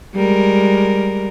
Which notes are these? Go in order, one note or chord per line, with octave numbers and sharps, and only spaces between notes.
G3 G#3 A#4